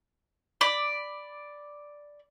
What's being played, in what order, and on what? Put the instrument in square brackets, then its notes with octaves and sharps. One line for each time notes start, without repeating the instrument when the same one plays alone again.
[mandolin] D5 B5